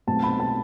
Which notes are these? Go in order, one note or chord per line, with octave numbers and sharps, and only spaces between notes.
B1 B2 A3 C4 A5
B5
A5